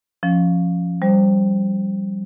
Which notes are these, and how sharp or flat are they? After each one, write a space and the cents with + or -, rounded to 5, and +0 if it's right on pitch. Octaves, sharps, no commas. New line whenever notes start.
F3 +0 C#4 -5
G3 +0 C5 +0